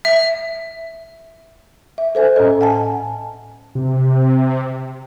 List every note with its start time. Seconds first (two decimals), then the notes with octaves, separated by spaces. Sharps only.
0.05 E5
1.98 E5
2.15 A4 C5 E5 G#5
2.36 A2 C#4 A4 D#5
2.61 F#5 G#5 A5
3.75 C3